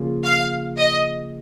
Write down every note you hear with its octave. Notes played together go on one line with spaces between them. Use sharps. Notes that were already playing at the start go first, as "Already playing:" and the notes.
Already playing: C#3 F3 A#3 F4 G#4
F5
D#5